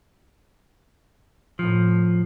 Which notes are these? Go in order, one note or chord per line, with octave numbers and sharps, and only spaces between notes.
A2 F3